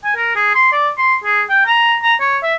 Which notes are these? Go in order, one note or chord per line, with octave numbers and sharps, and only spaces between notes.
G#5
A#4
G#4
C6
D5
C6
G#4
G5
A#5
A#5
C#5
E5